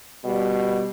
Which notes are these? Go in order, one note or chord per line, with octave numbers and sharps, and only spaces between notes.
B2 G3